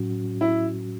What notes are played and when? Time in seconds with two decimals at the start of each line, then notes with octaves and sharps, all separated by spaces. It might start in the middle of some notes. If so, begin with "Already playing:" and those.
Already playing: A2 F#3 C#4 F#4
0.41 E4